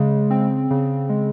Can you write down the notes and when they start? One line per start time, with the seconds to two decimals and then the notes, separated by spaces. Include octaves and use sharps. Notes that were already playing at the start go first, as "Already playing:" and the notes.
Already playing: C#3 G#3
0.30 C4
0.71 C#3
1.09 G#3